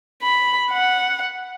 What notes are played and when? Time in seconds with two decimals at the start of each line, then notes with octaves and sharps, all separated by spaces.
0.22 B5
0.71 F#5